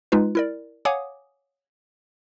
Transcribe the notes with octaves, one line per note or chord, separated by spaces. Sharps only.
G#3 D#4 F4 B4
E4 A#4 D5
C#5 F5 F#5 G#5 D6 D#6